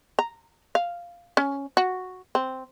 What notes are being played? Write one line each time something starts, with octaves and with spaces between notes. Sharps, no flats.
A#5
F5
C#4
F#4
C4